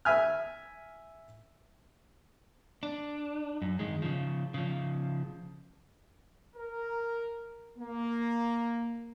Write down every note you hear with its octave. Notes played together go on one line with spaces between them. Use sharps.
E5 G#5 F6
D4
F#2
D#3 G#3
C#3 F3
C#3 F3
A#4
A#3